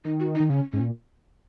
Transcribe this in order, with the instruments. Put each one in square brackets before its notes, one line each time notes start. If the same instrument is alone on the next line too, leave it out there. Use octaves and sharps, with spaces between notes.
[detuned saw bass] D#3 [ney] D#4
[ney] F#4
D#4
[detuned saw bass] D#3
[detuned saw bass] C#3 [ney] C#4
[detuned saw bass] G#2 [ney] C#4
[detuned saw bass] A#2